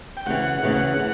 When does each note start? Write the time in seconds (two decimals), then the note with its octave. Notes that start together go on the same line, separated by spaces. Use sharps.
0.17 G5
0.26 D2 C#3 E3 F#5
0.63 D2 C#3 E3
0.99 E3